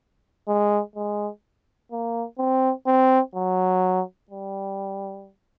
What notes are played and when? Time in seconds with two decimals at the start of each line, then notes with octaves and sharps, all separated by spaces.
0.48 G#3
0.96 G#3
1.92 A#3
2.38 C4
2.86 C4
3.35 F#3
4.30 G3